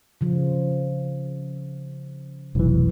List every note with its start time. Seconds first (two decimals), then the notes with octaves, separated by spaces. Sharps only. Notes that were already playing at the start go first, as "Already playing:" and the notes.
0.21 C#3 F3
2.55 F1 B1 E3